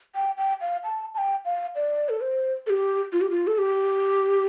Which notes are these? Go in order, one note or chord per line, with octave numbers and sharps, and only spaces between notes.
G5
G5
F5
A5
A5
G5
F5
D5
A4
C5
A4
G4
F4
G4
F4
A4
G4